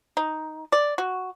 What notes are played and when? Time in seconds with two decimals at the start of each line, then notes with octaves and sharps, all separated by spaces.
0.17 D#4
0.72 D5
0.98 F#4